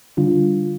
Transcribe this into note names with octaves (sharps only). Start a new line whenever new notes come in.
D3 G3 D4 F4